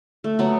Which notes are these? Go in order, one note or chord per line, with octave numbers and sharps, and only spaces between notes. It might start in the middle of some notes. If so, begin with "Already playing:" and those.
A3
F#3 B3